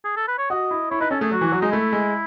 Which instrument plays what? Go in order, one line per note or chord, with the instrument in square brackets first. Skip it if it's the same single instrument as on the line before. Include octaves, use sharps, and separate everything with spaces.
[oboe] G#4
A4
B4
C#5
[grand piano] F#4 [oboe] D#5
[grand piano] E4
[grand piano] E4 [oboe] C#5
[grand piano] D#4 [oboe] B4
[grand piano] C#4 [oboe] A4
[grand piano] A3 [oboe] G#4
[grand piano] F#3 [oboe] F#4
[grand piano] E3
F#3
[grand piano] G#3 [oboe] D#4
[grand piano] A3 [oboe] E4
[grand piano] G#3